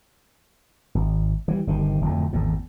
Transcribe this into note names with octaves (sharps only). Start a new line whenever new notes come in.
G#1
E3 G3
G1 C3 D#3
D1 F2 A2
G#1 E2 A2